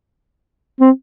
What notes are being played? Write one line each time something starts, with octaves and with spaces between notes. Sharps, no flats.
C4